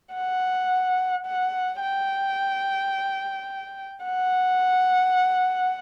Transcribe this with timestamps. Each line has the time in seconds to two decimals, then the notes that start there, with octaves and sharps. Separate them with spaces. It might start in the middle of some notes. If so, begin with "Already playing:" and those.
0.14 F#5
1.26 F#5
1.82 G5
4.06 F#5